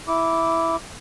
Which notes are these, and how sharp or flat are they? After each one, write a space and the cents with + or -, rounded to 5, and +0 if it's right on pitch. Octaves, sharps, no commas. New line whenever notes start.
E4 +0 D6 -10